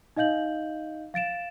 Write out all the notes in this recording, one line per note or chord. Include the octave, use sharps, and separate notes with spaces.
D#4 D#5 F5 G6 F#7
F5 A6 D7 E7